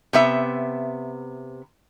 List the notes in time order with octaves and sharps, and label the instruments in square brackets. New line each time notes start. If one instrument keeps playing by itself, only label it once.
[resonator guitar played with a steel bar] C3 B3 E5